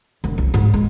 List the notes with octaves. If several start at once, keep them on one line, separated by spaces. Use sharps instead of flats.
E1
C2
G#2
G#3